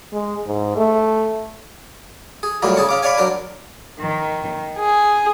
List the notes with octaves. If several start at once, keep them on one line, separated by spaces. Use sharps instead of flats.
G#3
G#2
A3
G#4
A2 F#3 G3 A#3 F4
C#3 G#4 A5 C#6
C#4 F5 D6
B4 C#5 D5 F5 G#5
F#3 D4 A#4 C5
D#3
G#4